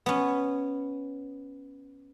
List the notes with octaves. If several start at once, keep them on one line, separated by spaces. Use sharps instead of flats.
B3 C#4